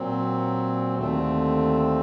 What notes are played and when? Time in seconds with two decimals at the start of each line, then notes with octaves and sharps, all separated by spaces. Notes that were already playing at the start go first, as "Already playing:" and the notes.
Already playing: A#2 F#3 C4
0.97 D#2 D3 A3 C4